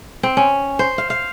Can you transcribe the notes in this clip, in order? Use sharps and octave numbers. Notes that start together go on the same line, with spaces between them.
C4
C#4
C5
F5
F5